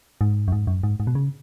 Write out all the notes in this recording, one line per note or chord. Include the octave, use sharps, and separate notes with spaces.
G#2
F#2
G#2
F#2
G#2
G#2
B2
C#3